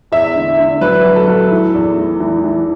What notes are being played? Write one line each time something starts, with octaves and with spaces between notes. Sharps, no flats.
E2 E5
D3
D3
F#3 B4
F#3
A4
F#3
E3
E2
E3
E3
E3